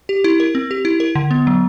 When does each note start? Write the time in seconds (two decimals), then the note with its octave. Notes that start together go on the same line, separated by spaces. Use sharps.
0.09 G4
0.24 E4
0.40 A#4
0.55 C4
0.71 G4
0.85 E4
1.00 A#4
1.15 D3
1.31 B3
1.47 F#3